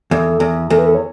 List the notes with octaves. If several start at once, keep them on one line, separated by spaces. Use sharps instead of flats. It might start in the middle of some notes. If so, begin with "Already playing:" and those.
E2 A4
E2
E2 A4
B4
A4
C#5